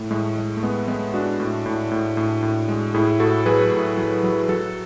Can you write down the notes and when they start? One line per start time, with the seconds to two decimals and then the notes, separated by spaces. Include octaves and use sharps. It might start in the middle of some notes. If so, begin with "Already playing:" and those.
Already playing: A2 A3
0.11 A2 G#3
0.37 G#3
0.57 A3
0.63 G#3 B3
0.88 G#3 B3
1.14 G#3 D4 F#4
1.40 A2
1.66 A2
1.91 A2
2.17 A2
2.43 A2
2.69 G#3
2.94 A2 E4 G#4
3.20 A2 F#4 A4
3.46 F#3 G#4 B4
3.72 A2
3.98 F#3
4.23 F#3
4.49 F#3 F#4 A4